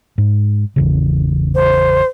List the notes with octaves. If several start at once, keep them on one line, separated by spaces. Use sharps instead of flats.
G#2
G#1 E2 C#3
C5